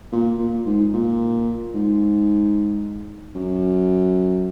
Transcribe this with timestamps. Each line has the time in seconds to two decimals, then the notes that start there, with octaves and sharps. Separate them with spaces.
0.12 A#2
0.39 A#2
0.66 G#2
0.93 A#2
1.74 G#2
3.35 F#2